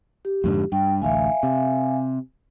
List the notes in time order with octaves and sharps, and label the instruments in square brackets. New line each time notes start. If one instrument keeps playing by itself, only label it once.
[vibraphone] G4
[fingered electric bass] F2 G#2 D3
[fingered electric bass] G2 [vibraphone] G5
[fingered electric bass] A1 D2 [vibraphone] E5 F5 G#5
[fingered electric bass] C3